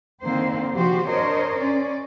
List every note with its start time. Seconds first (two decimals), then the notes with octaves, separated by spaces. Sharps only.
0.22 D3 D#3 A#3 C4 C5
0.74 C3 F3 F#4 G4 C5
1.08 D4 A#4 C5 C#5 D#5
1.57 C#4 D5